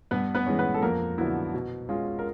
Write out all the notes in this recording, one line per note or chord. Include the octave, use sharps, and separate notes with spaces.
G2 B3 B4
B3 B4
E3 G#3 C#4
B3 B4
A4
F2 A#3 A#4
D3 F#3 B3 E4
B2
G#3 C#4 F4
A#4